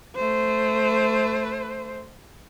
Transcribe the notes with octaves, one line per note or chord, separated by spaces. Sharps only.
A3 C5